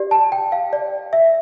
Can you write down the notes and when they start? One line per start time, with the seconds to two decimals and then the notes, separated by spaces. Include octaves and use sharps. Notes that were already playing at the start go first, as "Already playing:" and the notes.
Already playing: G4 D5
0.11 A5
0.32 G5
0.52 F5
0.73 D5
1.13 E5